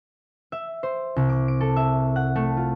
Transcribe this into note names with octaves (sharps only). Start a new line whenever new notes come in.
E5
C5
C2
D6
D7
A4
E5
F#5
A3
F4